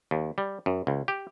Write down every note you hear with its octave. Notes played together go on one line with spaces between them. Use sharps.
D#2
G3
F#2
C#2
G4